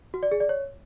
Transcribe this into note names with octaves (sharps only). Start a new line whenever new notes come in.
F#4
D5
G#4
D5
C#5